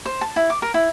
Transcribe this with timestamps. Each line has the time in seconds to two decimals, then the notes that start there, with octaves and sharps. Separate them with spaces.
0.05 C5
0.21 A5
0.36 E4
0.50 D6
0.62 A#4
0.74 E4